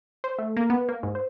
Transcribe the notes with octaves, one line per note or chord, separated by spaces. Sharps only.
C5
A3
A#3
B3
A#3
G#2
C5